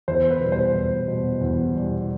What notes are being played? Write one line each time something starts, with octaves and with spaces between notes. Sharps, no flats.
E2 C5
B4
B2 G3
C5
E2
B2 G3
E2
B2 G3